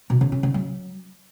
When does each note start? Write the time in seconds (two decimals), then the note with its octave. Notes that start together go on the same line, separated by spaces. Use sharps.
0.10 B2
0.21 C#3
0.32 C#4
0.43 C#3
0.54 F#3